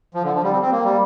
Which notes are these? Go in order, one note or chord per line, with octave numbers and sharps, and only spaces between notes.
F3
D3
F3
G3
C4
C4
A#3
G3